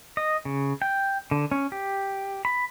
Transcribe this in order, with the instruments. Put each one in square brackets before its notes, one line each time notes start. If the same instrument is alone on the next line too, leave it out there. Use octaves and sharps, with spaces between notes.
[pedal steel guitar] D#5
C#3
G5
D3
C#4
G4
B5